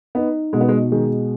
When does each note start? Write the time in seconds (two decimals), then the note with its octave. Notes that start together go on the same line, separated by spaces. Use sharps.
0.15 B3 D#4
0.53 B2 G#3
0.61 B3
0.69 G#3
0.92 D#3 G#3